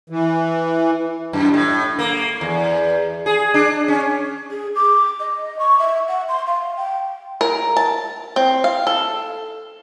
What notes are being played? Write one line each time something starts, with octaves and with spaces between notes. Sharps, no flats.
E3
F#2
A2
A#3
E2
G#4
D4
C#4
G#4
D6
D#5
C#6
E5
F#5
C6
F5
G5
A#4
A5
C4
F5
A4